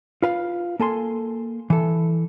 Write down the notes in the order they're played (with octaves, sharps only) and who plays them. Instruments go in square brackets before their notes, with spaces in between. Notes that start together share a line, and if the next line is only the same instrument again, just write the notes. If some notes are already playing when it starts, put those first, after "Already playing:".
[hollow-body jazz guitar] F4 B4 F5
A#3 A4 G#5 C6
E3 A4